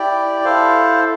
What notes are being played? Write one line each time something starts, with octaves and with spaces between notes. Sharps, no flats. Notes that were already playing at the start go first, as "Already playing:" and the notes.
Already playing: E4 G4 D5 G5
E4 A4 C5 F5